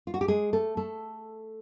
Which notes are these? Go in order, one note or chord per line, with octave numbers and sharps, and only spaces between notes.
F4
F#4
G4
G#3 G#4
A3 A4
A3 A4